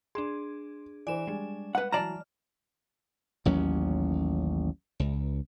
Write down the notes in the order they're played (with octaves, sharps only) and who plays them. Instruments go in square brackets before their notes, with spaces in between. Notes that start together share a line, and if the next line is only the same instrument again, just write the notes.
[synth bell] D4 G#4 [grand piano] C6 E7
[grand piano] E3 C5 [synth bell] D5 E7
[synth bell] G3 G#3 [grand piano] D4 G#5
[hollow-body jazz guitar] B4 F#5
[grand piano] E3 F#3 [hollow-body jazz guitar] D5 A5 A#5 [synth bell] F6
[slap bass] A1 D#2 F#3 C#4
C#2